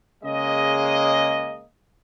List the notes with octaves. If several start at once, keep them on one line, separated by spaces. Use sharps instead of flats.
C#3 G#3 A#3 D#5